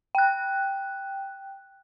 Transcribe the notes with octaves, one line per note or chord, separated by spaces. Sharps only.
G5 F#6